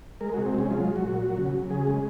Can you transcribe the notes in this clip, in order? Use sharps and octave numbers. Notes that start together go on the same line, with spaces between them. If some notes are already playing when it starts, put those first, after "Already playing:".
G#3 A#4
F#4
C3
C4
G#3 C#4
F#3 F4
F#3
F#4
A#2
F#3
C#3
F#3
C#3 G#4
G#3